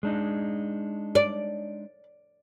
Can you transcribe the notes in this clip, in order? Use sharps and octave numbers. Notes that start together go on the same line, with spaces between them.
G#3 D4 D#4
D5